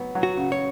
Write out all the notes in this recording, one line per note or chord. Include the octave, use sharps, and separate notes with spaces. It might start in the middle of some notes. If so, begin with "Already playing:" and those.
Already playing: F#3 B3
F#3
F#4
C#3
C#5